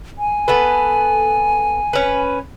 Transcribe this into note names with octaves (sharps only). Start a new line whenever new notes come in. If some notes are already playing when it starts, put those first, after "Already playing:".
G#5
B3 A4 B4
C#4 B4